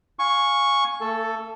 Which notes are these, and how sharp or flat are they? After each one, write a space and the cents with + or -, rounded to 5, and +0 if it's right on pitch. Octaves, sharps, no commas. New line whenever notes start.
F5 +20 G#5 +0 C#6 +0
A3 +40 A4 +0